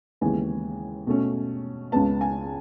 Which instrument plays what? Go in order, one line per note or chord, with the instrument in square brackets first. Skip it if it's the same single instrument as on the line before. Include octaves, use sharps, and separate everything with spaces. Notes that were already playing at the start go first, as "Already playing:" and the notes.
[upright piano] D#2 C#3 E3 G#3 B3 G#5
B2 A3 C#4
C#2 C#3 G#3 B3 A5
G#5